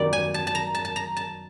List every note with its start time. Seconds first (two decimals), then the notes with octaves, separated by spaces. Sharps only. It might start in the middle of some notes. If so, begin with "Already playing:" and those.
Already playing: F#2 D#3 G3 B3 D5
0.13 G#5
0.34 A5
0.47 A5
0.55 A#5
0.75 A5
0.85 A5
0.96 A#5
1.17 A5